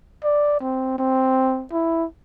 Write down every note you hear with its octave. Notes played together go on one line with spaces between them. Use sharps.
D5
C4
C4
E4